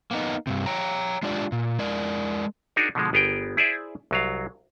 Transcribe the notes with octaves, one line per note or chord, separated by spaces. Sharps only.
A#3 B3 D#4
G2 C3
C#5 G5 A#5
G#3 D4 F4 G4 D5
A#2
G#3 A#4 D5
D4 D#4 F#4 G#4 A#4
B2 D3 F3 G#3
G1 B3 G#4 A#4 G5
E4 G#4 C5 D5 E5
C2 F#3 F5